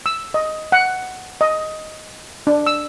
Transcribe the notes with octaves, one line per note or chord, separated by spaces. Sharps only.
E6
D#5
F#5
D#5
D4
E6